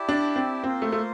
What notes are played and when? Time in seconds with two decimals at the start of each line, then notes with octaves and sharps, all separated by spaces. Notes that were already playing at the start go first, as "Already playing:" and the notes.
Already playing: E4 G4 D5 A5
0.09 D4
0.36 C4
0.64 A#3 C4 F4 C5
0.82 A3
0.92 A3